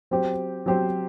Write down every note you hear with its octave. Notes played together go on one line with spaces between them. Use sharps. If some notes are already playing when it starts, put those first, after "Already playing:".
F#3 C4 G4 C5
F#3 C4 G4 C5